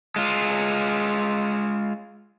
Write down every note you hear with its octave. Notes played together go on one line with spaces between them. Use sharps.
G#3 F4